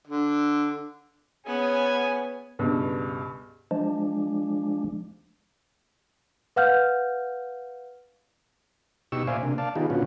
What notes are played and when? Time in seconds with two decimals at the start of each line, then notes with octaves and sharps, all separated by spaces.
0.08 D3
1.47 B3 C#4 G#4 G#5
2.59 C#2 G2 B2
3.71 F3 G#3 D4
6.56 B4 F5 F#5 F6 G6
9.12 B2 D#4 G4 C#6 E6
9.27 A#2 C5 D5 E5 F5 G#5
9.43 C3 A#3 D4
9.58 D5 F5 A5
9.76 D#3 B3 D#4 F4 G4 G#4
9.90 A#2 D3 B3 C#4 F4 F#4